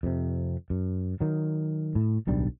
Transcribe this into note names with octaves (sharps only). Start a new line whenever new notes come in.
F2 C3
F#2
D#3 F#3
A2
D1 B1 G3 D4